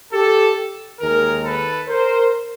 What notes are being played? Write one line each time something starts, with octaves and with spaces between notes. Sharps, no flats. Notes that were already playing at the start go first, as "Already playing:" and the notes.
G4 A4
D#2 D#3 G#3 G#4 A#4
A4 B4
A#4 C5